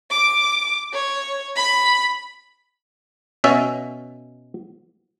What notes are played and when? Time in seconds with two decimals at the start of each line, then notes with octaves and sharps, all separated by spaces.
0.11 D6
0.93 C#5
1.56 B5
3.44 B2 C#4 E5